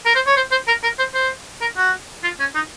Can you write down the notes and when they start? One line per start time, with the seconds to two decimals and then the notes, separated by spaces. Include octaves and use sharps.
0.05 A#4
0.15 C5
0.26 C#5
0.36 C5
0.51 C5
0.67 A#4
0.83 A#4
0.98 C5
1.14 C5
1.61 A#4
1.77 F#4
2.23 F4
2.40 C#4
2.55 D#4